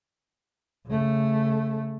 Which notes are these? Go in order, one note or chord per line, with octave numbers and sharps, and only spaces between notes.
C#3 A3